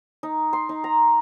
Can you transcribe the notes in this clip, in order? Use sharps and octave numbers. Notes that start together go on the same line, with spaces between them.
D#4
C6
D#4
A#5